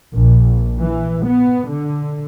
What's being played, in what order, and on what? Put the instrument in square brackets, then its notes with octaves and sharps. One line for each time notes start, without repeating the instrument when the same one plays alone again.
[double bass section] A#1
E3
B3
D3